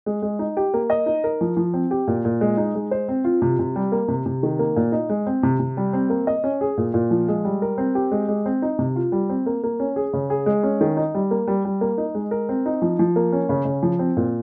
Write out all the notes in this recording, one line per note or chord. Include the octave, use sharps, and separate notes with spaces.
G#3
G#3
D#4
G4
A#3
D#5
D#4
A#4
F3
F3
C4
G4
A#2
A#2
G#3
D#4
G#3
C5
C4
F4
C3
C3
G3
A#3
C3
C3
D#3
A#3
A#2
D#4
G#3
C4
C3
C3
G3
C4
A#3
D#5
C#4
G#4
A#2
A#2
F3
G#3
G3
A#4
C4
G4
G#3
G#3
C4
D#4
C3
F4
G3
C4
A#3
A#3
C#4
G#4
C#3
G#4
G#3
C#4
D#3
D#4
G3
A#3
G3
G3
A#3
D#4
G#3
A#4
C4
D#4
F3
F3
A#3
C#4
C#3
C#3
F3
C4
A#2